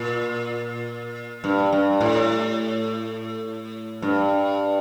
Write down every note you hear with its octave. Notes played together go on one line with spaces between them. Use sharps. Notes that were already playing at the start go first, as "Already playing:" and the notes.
Already playing: A#2
G2
G2
A2
G2